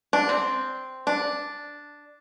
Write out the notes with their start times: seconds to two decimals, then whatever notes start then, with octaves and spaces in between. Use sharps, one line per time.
0.13 D4
0.29 C4
1.07 D4